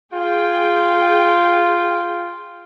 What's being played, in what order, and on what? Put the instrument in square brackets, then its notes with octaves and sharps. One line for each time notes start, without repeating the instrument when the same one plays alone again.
[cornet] F4 [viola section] G#4 G5